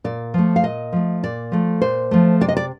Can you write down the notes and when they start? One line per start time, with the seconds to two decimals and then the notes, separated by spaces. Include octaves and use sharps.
0.04 A#2 D5
0.34 F3 A3
0.56 F5
0.64 A#2 D#5
0.93 F3 A3
1.23 A#2 D5
1.52 F3 A3
1.82 A#2 C5
2.11 F3 A3
2.41 C3 D5
2.48 D#5
2.57 D5